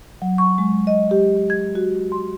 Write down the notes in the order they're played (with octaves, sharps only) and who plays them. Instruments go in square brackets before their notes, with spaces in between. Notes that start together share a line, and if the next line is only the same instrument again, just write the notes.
[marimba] F#3
C#6
G#3
D#5
G4
G#6
F#4
C6